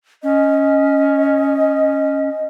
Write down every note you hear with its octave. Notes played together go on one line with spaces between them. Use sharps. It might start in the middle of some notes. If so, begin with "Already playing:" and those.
C#4 D#5